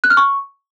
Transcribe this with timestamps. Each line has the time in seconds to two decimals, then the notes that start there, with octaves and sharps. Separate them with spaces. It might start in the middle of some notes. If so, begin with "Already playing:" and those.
0.04 F#6
0.10 F6
0.17 C#6